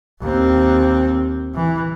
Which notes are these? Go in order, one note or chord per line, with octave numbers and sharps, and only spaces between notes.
D#2 C4
E3